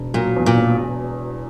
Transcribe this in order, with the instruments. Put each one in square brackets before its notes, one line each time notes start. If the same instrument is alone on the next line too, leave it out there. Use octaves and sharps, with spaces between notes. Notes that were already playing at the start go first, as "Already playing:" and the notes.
Already playing: [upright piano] E1
[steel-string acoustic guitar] A#2 [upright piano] F#3
[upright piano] E2
[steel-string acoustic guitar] A#2
[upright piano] E1